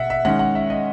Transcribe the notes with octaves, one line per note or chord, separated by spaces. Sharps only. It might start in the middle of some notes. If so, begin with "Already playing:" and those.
Already playing: B2 E5 F#5
E5
D#3 G#3 C#4 F#5
F#5
E5
D#5